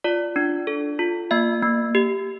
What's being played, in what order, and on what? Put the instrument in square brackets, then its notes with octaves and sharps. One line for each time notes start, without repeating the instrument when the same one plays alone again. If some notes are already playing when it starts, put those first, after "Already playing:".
[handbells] F4 D5
D4
A4
F4
A#3 E5
A#3
G4